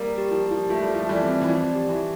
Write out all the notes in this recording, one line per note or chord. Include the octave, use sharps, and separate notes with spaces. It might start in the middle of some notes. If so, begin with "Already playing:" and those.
Already playing: G3 A#3 A#4
G4
F3
G4
F3
A3 F4
G3
F3 A3 F4
E3 G3
C4
E3
F3 D5
G4
E3